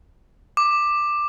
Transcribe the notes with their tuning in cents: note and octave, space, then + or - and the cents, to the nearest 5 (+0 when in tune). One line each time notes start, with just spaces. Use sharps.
D6 +10